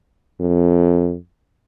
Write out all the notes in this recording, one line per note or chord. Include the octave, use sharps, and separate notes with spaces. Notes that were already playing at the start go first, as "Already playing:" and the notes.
F2